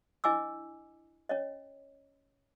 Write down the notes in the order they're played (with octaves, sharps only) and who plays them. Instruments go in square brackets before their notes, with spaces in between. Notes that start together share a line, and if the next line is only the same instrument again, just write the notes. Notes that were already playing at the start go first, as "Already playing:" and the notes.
[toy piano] D4 E4 D#5 G#5 D6 E6
C#4 C#5 D#5